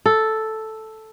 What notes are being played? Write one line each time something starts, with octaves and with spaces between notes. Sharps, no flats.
A4